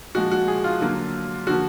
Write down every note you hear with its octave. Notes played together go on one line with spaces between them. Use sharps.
A#2 F3 G#3 F#4
F#4
G#4
F4
D3 F#3 A#3
D3 F3 A#3 F#4